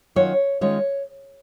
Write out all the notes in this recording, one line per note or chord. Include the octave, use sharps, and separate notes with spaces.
D#3 F#3 C#4 F4 C#5
D#3 G#3 C#4 F4 C#5